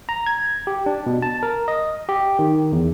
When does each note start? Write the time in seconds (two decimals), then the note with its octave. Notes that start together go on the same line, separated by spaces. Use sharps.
0.09 A#5
0.26 G#6
0.67 G4
0.86 D4
1.06 B2
1.22 A5
1.43 A#4
1.68 D#5
2.09 G4
2.39 D#3
2.72 E2